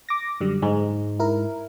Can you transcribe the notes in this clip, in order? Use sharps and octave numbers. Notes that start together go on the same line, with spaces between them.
D6 A#6
F#2 D3 G3
G#2 G#3
E4 A#4